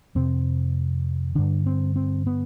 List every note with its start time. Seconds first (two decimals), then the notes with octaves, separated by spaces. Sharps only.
0.15 F2 C3 C4
1.35 G2 D3 D4
1.66 C4
1.96 C4
2.27 B3